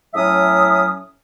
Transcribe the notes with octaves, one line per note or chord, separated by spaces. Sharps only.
A2 F#3 C#4 E5 D#6